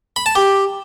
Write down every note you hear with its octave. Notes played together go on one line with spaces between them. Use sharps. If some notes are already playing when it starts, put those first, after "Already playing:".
B5
A5
G4